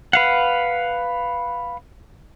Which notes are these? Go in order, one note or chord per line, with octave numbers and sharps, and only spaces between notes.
B4 F5 F#5